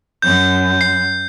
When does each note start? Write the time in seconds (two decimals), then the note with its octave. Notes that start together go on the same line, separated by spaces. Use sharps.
0.22 F#2 G6
0.81 C7